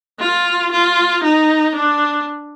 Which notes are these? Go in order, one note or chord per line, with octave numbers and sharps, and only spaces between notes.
F4
F4
D#4
D4